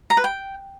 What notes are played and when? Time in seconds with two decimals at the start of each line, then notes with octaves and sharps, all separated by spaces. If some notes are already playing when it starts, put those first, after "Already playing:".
0.10 A#5
0.17 B4
0.24 G5